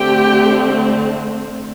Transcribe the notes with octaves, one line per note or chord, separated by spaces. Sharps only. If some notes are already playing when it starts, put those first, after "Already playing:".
Already playing: D3 A3 C4 G4 G5